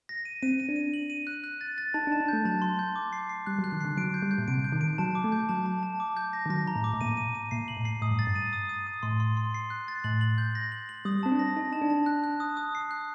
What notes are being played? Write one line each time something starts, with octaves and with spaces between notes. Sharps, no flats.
A#6
D#7
C4 D#7
D#7
D4
D#7
F#7
D#7
F#6
F#6
A6
A6
D#4 A5
D4
A5
D4
A3 G6
F#3 A5
C6
G6
D6
C7
C7
G3 F#6
F#3
F#6
D#3
D3 C7
F#3 D7
G6
G3
G6
A#2
C3 D7
G6
D#3
D7
F#3 A5
D6
A3
G6
F#3 A5
A5
A5
D6
G6
A#6
D#3
F#3 A#6
A#5
A2
D6
A2
A#2 D#7
D#7
D#7
A#2 C7
F#7
A2
C7
A2 D#6
G2
A6
G2
D#7
D#6
D#6
D#6
A2 C6
C6
C6
C7
F#6
A6
A2 F#7
F#7
G6
A#6
F#7
F#7
G3 D#6
C4 A5
D4
A#6
D#4 A#6
A5
D4
A5
F#6
F#6
D#6
D#6
C7
F#6